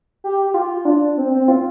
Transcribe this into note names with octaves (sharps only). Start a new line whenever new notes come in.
G4
G4
F4
D4
C4
C4
F4